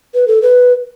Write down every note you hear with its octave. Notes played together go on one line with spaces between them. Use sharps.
B4
A4
B4